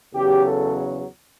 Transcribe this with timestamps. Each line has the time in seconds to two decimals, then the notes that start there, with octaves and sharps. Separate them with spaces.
0.13 E2 C#3 F#3 G4
0.43 A4